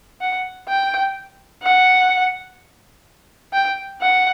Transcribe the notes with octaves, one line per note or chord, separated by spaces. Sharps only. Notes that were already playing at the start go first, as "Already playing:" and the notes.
F#5
G5
F#5
G5
F#5